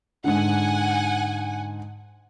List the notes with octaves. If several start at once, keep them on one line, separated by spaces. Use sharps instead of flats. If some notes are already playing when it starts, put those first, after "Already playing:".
G#2 D3 F#5 G#5